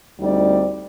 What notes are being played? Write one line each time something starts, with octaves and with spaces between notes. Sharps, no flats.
D2 G3 C4 D#4 D5